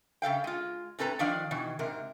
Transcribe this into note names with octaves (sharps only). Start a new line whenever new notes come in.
C#3 A4 F5 G5
G#3 F4
A2 C4 A4 B4 A#5
D#3 F3 D4 D5 F5
B2 D#3 E3
G#2 C3 A#4